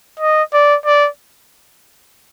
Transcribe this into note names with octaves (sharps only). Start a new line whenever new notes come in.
D#5
D5
D5